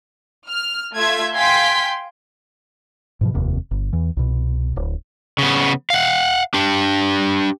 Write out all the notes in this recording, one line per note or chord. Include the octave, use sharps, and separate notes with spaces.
F6
A3 F4 E5 G#6
F5 G5 G#5 C6 G6 B6
G#2 B2 F3
F1 D#2 C3
G1
E2 E3
C2 B2
D1
C#3 B3
F5 F#5
D4 G4